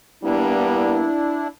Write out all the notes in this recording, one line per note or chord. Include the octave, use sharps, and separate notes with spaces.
G3 A#3 B3 D4 E4